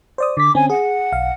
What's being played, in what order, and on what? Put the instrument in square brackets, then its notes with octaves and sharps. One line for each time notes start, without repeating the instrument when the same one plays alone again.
[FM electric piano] C5 D5 D#6
[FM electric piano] D3 B6 [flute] D6
[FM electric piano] D3 C4 C#4 [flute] G#5
[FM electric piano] G#4 [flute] F#5
[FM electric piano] B1 F5